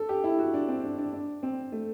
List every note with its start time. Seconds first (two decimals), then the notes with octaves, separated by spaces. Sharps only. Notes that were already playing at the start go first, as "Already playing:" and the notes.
Already playing: A4
0.09 G4
0.24 E4
0.39 F#4
0.54 D4
0.68 C4
0.83 D4
0.98 D4
1.13 D4
1.43 C4
1.72 A3